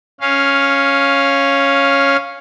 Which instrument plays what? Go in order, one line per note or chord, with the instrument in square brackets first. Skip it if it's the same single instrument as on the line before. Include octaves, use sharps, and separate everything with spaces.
[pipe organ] C#4 F5